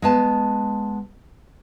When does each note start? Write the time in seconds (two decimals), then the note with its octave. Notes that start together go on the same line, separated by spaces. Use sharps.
0.02 G#3 B3 A5